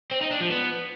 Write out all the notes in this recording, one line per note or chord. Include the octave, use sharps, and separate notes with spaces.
C4
D#4
D4
F3
B3